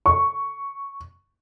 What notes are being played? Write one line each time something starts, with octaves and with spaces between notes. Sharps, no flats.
C#6